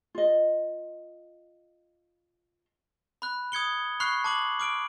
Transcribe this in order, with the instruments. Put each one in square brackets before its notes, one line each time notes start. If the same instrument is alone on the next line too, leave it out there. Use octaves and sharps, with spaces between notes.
[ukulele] F4 D#5
[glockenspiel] B5 F#6
D#6 G#6 C#7 G7
B5 C#6 F6 F#6 C7
A5 D6 F#7
D6 F6 D7